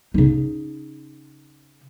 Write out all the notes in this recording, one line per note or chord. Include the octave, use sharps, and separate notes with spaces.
C#3 D#4